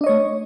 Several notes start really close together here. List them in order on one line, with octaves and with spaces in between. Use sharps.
D4 D#5 C#5 A3